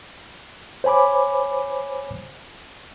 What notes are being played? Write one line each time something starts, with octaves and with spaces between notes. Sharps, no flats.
C5 C#5 G#5 B5 D6